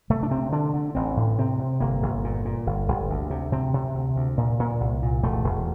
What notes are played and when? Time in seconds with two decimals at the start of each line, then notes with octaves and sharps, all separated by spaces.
0.10 C3 A3
0.23 D4
0.30 C3 C4
0.52 D3 D4
0.74 D3
0.95 A1 C4
1.17 A2
1.38 C3 C4
1.59 C3
1.80 G1 A#3
2.02 G1
2.24 A#2
2.45 A#2
2.67 G1
2.88 G1
3.10 D2
3.30 C3
3.52 C3 C4
3.74 C3
3.95 D2
4.16 D2
4.37 A#2
4.60 A#2
4.81 C2
5.02 A#2
5.23 E1 A3
5.44 E1